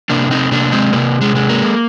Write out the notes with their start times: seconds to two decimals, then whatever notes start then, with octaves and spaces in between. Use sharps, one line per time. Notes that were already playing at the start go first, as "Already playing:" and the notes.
0.10 C3 A#3 D4
0.31 C4 D#4
0.51 C3 A#3 D4
0.72 G#3 C4
0.93 C3 A#3
1.21 G#3
1.36 G#3
1.49 A#3